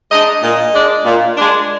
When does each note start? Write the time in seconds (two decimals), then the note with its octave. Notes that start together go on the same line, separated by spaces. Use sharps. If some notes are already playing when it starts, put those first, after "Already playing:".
0.11 G#3 D4 D#5
0.43 A#2 D#5
0.74 G#3 D4
1.06 A#2
1.37 G#3 D4